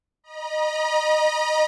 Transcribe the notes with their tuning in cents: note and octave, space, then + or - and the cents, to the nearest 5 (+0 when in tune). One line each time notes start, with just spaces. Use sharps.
D#5 -20 A#5 +45